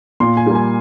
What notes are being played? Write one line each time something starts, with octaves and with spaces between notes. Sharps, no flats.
A#2 C6
G#5
G3 A#3
G#5